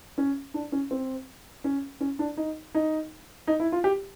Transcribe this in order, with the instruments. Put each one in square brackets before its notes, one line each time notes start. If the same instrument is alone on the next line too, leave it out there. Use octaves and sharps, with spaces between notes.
[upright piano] C#4
D4
C#4
C4
C#4
C#4
D4
D#4
D#4
D#4
E4
F4
G4